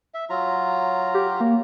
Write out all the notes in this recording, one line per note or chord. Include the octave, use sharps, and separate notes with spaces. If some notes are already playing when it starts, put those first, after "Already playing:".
E5
F#3 F4 A#5
G4
A#3